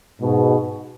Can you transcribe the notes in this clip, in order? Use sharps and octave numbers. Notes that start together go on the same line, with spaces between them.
G#2 B2